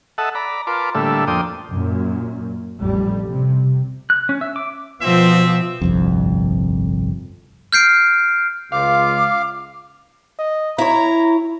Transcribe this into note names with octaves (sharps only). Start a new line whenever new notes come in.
A4 D#5 E5 F#5 A5
D5 A#5 B5
F4 A#4 B4 A5 C6 D6
A2 D3 G3 A#3 A4 E5
F2 A#3 D4 G5 C6 D#6
F#2 A#2
A1 F2 G3
C3
F#6
C#4
E5
D6
B2 F3 C4 E5
G1 C2 F2
F6 G6 C7 D7
C#2 F4 F5 D6
D#5
E4 C#5 A#5